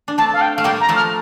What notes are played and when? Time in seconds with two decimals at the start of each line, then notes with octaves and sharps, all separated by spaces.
0.08 D4
0.18 A3 C4 A5
0.33 F5
0.41 G5
0.56 A3 F5
0.64 G3 A#3 G5
0.81 A#5
0.89 F3 A3
0.96 F6